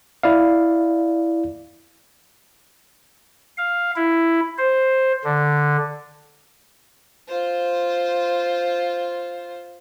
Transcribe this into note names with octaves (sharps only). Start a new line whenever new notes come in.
E4 D5 F5
F5
E4
C5
D3
F4 C5